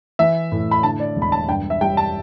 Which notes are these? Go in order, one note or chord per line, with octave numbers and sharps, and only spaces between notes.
E3 E5
A2
B5
D3 A5
D5
E1
B5
A5
G2 G5
E5
G3 G5
A5